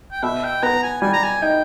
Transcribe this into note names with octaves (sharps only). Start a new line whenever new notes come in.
G5
B2 E5
G5
B3 A#5
G#5
G3 G#5
A#5
G#5
D#4 G5